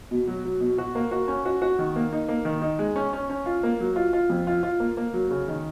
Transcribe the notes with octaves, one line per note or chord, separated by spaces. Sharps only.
B2
F#3
F#3
B2
F#4
A#3
F#4
C#4
F#4
F#4
D#3
A#3
D#4
A#3
D#3
D#4
G#3
C#4
C#4
C#4
F4
A#3
F#3
F4
F4
F2
F4
F4
A#3
A#3
F#3
C#3
D#3